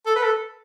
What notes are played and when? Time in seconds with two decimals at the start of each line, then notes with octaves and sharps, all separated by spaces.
0.06 A4
0.16 B4
0.24 A4